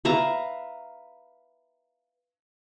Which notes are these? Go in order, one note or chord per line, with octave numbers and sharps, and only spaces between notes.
B4 E5 F5 A#5